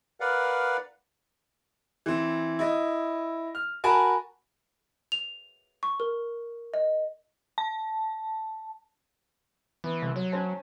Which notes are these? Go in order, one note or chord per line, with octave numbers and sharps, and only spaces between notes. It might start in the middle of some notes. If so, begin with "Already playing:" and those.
A#4 B4 D5 F5 F#5
E3 C4
E4 D#5
F6
F#4 A#4 G#5 A5 B5
F7
C#6
A#4
D#5
A5
E3 B3
C2
F#3 C#5
C#4 C5 A5